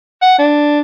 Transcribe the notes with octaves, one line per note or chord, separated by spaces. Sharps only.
F#5
D4